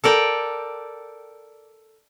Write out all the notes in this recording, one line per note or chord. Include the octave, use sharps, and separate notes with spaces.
A4 A#4 D5 G5